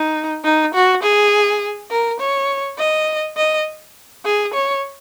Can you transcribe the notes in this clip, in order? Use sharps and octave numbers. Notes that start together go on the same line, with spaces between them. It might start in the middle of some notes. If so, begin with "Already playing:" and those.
Already playing: D#4
D#4
F#4
G#4
A#4
C#5
D#5
D#5
G#4
C#5